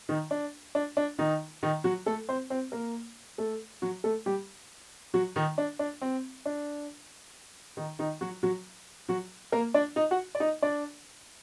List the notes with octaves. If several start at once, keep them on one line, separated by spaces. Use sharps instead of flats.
D#3 D#4
D4
D4
D4
D#3 D#4
D#3 D#4
F#3 F#4
A3 A4
C4 C5
C4 C5
A#3 A#4
A3 A4
F#3 F#4
A3 A4
G3 G4
F#3 F#4
D#3 D#4
D4
D4
C4
D4
D#3 D#4
D#3 D#4
F#3 F#4
F#3 F#4
F#3 F#4
A#3 A#4
D4 D5
D#4 D#5
F#4 F#5
D5
D#4 D#5
D4 D5